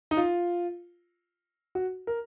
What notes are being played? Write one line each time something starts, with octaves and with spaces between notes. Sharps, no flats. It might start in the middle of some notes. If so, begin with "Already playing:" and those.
D#4
F4
F#4
A#4